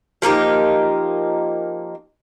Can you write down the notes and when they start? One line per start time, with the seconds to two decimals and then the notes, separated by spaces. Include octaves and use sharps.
0.22 F3 A#3 D#4 G4